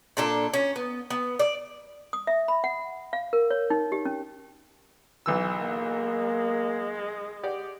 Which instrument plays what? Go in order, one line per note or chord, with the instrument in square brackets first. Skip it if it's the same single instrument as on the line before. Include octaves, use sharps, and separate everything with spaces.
[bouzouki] A#2 D4 A4
C#4
B3
B3
D5
[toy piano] D#6
E5
B5
F#5
F5
A#4
C#5
D#4
G4
C#4
[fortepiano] B1 E3 E6
[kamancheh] G#3 [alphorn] A#3
[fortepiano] G4 D5 F#5